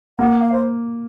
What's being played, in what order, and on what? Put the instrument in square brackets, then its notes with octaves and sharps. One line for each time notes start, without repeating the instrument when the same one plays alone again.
[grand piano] A#3 [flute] F#5
[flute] F5
C5